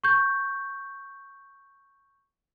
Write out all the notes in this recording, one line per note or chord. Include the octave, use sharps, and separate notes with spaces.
C#6 G6